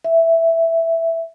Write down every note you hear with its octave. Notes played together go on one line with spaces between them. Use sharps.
E5